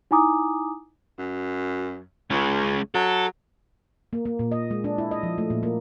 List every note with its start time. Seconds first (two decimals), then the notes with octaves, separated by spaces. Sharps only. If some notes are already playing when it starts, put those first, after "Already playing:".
0.11 D#4 E4 G#5 A#5 D6 D#6
1.18 F#2
2.30 C#2 G#3 C#4
2.95 F#3 A4
4.13 A#3
4.25 A#3
4.39 A#2
4.52 D#5
4.71 G#3
4.84 D4
4.98 E4
5.11 D#5
5.23 F3
5.38 A3
5.50 A#2
5.63 A#3